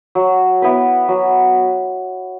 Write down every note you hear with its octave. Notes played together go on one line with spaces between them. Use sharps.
F#3
B3 E4 B4
F#3